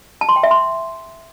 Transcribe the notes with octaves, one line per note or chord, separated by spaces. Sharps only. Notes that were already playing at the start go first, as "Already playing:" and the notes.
A5
C6
G5
E5
C6